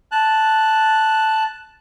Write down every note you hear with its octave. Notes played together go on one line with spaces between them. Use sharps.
A5 F#6